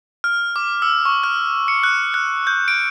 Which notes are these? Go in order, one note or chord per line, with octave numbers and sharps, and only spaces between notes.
F6
D6
E6
C#6
F6
C#7
F#6
F#6
G6
D7